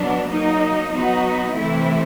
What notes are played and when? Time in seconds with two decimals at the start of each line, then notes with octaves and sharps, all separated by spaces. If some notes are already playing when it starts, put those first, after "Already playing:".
Already playing: B2 F#3 B3 D4
0.30 F#3 A#3 D#4
0.93 F#3 B3 D#4 F#4
1.56 C3 E3 A3 C4 E4